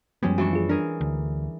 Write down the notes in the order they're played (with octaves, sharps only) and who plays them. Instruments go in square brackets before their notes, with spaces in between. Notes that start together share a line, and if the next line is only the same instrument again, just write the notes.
[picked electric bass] F#2 F3 B3 [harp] G3 G#3 C#4
[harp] E3 D4 C#6 [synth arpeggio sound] F#4
[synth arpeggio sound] F4 G#4
[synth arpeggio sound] D4 [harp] G#4 A#4
[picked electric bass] D2